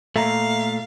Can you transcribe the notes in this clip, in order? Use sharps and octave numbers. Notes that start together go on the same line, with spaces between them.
A#2 A3 E5 F5 A#5